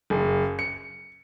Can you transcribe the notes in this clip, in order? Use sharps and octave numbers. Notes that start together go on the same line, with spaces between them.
F#1
C#7